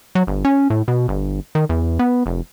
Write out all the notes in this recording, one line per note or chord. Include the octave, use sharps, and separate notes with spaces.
F#3
G1
C#4
A2
B2
G1
D#3
E2
B3
F1